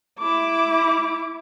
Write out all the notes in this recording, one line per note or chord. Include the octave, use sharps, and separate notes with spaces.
E4 D6